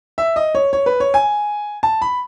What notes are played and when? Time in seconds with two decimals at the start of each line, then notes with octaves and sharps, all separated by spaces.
0.18 E5
0.36 D#5
0.55 C#5
0.73 C#5
0.86 B4
1.00 C#5
1.14 G#5
1.83 A5
2.02 B5